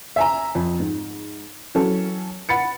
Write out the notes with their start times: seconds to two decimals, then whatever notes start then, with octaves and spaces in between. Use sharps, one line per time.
0.16 E5 G#5 A#5
0.55 F2
0.80 G#2
1.74 E3 F#3 C#4 A4
2.49 F#5 B5 A6 C#7